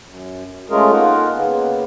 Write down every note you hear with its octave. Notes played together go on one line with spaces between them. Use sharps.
F#2
G#3 A3 C#4 F4 G#4 A#4
A#3 D#4 F4 A#4 F#5
C#3 A#3 B3